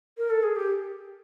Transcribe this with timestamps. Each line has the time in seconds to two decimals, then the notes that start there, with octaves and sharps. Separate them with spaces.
0.17 A#4
0.30 A4
0.43 G#4
0.56 G4